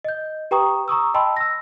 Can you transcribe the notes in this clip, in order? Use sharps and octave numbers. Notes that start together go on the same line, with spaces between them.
D#5 G6
G4 B4 G5 A#5 C#6 D#6
A#5 C#6 D#6 E6
D#5 G5 A5 B5 C6 E6
E6 A#6